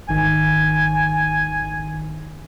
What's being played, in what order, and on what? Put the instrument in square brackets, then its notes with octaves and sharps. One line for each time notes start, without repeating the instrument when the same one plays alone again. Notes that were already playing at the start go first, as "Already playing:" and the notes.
[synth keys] G#1 D#3 [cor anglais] G#5